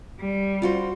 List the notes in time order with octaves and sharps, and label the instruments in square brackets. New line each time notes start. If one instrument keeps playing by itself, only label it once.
[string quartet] G3
[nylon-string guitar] F4 F#4 C5